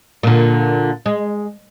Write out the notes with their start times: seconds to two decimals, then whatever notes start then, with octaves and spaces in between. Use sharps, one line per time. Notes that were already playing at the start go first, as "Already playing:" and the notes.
0.23 A#2 D3
1.06 G#3